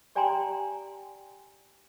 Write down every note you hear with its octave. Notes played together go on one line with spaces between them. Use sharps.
G4 D5 G5 G#5 A#5 C6